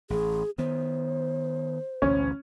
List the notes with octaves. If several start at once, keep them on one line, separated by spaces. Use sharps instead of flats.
A1 G#4
D#3 B3 C5
A1 D2 B2 C#4